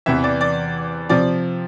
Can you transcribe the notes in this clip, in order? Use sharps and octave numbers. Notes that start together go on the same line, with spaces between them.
E2 C3 E3 E5
D5
D5
C3 F3 D5